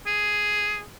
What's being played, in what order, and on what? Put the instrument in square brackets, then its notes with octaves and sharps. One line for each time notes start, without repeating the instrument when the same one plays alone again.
[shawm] G#4